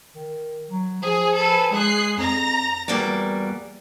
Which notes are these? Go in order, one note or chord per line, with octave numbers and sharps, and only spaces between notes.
D#3
F#3
F3 G#4
A4 B4 G#5
G#3 G#4 F#6 C7
F2 A#5 A#6
E2 G3 A#3 F#4 D5